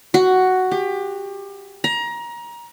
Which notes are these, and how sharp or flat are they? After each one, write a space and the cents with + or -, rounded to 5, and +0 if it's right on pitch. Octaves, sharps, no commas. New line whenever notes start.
F#4 +5
G4 +25
A#5 +25